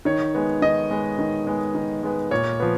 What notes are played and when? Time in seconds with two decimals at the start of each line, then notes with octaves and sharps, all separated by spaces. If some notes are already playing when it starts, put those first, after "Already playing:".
0.05 D#3 C#5
0.34 G#3 B3
0.62 D#3 D#5
0.91 G#3 B3
1.19 D#3
1.47 G#3 B3
1.75 D#3
2.03 G#3 B3
2.31 A#2 C#5
2.60 F3 B3